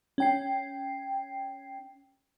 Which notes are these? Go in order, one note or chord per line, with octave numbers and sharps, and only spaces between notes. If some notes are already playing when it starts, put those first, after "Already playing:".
C#4 G5 C7